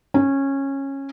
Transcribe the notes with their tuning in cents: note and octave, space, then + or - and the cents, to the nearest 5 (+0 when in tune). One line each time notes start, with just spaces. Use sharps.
C#4 -15